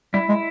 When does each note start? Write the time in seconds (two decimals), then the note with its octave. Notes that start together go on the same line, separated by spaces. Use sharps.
0.14 G3 E4
0.29 G#3